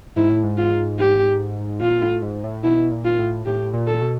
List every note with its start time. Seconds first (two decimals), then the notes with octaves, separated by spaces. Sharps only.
0.16 G#2 E4
0.30 A2
0.43 G#2
0.58 F4
0.99 G4
1.81 A#2 F4
2.02 A2
2.22 G#2
2.44 A2
2.64 B2 E4
2.91 A#2
3.05 F4
3.19 A2
3.46 A2 G4
3.74 A#2
3.87 A4
4.02 B2